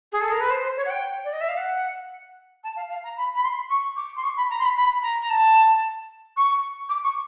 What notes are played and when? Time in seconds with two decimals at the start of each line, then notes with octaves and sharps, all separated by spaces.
0.12 G#4
0.21 A4
0.32 A#4
0.40 B4
0.50 C5
0.63 C5
0.76 C#5
0.85 F#5
0.90 G5
1.24 D5
1.33 D#5
1.40 E5
1.48 F5
1.57 F#5
2.63 A5
2.76 F5
2.89 F5
3.04 A#5
3.17 B5
3.35 B5
3.43 C6
3.70 C#6
3.96 D6
4.16 C6
4.23 C#6
4.37 B5
4.50 A#5
4.59 C6
4.64 B5
4.77 B5
5.02 A#5
5.22 A#5
5.29 A5
6.36 C#6
6.89 D6
7.03 C#6